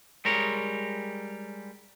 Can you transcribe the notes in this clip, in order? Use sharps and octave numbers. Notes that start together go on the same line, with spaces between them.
G3 G#3 A#4 C#5